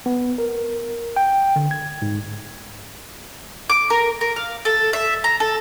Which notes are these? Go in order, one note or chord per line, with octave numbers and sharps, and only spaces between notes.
B3
A#4
G5
D3
G#6
G#2
D6
A#4
A#4
F5
A4
E5
A#5
A4